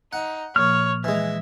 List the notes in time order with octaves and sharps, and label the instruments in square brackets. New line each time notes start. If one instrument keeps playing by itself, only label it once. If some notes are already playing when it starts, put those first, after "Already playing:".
[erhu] D#4 [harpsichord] F#5
[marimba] A#2 F3 A#3 [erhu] C#5 [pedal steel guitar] F6
[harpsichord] E3 G#3 [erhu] E5